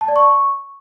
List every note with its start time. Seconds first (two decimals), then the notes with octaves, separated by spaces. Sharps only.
0.01 A5
0.08 D5
0.16 C#6